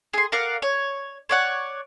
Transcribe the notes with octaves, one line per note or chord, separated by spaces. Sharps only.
G#4 C6
A#4 D5 F5 F#5
C#5
C#5 D5 F#5